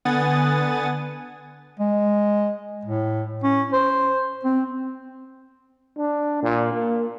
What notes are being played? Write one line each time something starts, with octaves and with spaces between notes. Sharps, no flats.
D3 B3 F#5 G#5 D#6 A6
G#3
A2
C#4
C5
C4
D4
A#2
A#3